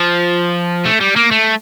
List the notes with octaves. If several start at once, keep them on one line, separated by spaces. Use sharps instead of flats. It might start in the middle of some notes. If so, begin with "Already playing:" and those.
Already playing: F3
A3
G3
A#3
A3